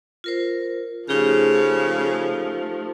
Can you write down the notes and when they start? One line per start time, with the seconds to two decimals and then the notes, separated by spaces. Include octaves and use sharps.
0.24 F4 A#4 C5
1.09 C#3 F3 A3 D#4 G4